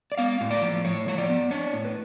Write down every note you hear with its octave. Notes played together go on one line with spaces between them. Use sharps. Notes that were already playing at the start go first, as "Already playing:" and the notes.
D5
B3 F5
A2
D5
F3
A2 C#5
F3 C#5
D5
B3
D4 C#5
A2
B4